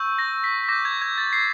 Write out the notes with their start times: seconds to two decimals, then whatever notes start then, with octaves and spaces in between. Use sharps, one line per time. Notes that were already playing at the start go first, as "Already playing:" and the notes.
Already playing: C#6 E6 G6
0.19 A#6
0.44 B6
0.64 B6
0.69 D6 G6 A#6
0.85 G#6
1.02 G#6
1.18 A6
1.33 C7